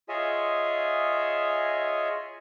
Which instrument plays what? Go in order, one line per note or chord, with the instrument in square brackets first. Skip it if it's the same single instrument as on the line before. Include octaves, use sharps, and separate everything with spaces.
[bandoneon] F4 G#4 C#5 D#5 E5 G#5